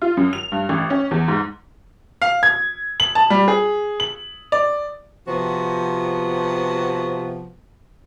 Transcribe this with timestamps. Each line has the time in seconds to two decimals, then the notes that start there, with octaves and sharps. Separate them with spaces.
0.02 F4
0.17 F#2
0.33 F7
0.52 G2
0.69 A1
0.90 C#4
1.11 E2
1.28 G#2
2.22 F5
2.43 G#6
3.00 F#7
3.15 A5
3.30 G3
3.48 G#4
4.00 F#7
4.52 D5
5.28 C3 F3 B3 F#4